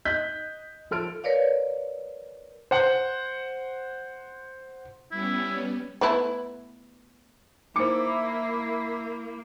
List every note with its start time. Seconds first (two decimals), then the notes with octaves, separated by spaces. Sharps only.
0.05 D#5 F#6 G6 B6
0.91 F3 A4 F6 D7
1.24 A#4 B4 C#5 D5 F5
2.71 C5 F#5
5.11 G3 B3 C#4 E4
6.01 A3 B3 E4
7.76 A#3 D#4 E4 C5 D6 C#7